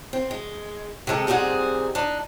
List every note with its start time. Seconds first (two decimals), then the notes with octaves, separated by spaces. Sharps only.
0.13 C4
0.31 G#3
1.07 C3 D#3 G#3 A4
1.27 A#2 G3 C4 D#4 G#4 F#5
1.95 D4 D#4